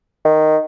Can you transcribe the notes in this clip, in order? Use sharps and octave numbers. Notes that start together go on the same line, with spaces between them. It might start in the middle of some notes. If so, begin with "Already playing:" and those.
D#3